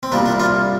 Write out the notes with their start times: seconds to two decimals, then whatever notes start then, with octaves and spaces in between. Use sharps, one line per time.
0.03 C4
0.12 C2 A#2 G3 A#3 D4
0.26 D4
0.40 D4 F4